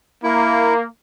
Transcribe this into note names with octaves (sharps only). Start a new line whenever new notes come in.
A#3 E4